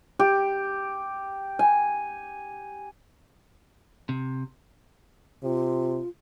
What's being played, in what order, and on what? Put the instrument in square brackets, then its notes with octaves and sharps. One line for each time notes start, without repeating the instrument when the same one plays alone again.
[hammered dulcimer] G4
G#5
[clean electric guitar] C3
[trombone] C3 [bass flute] F4